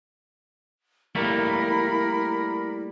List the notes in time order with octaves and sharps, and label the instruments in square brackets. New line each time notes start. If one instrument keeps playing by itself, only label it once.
[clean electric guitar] G3 A3 A#3 [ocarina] E4 [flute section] A#4 B5